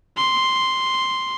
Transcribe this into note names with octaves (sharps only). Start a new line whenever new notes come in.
C6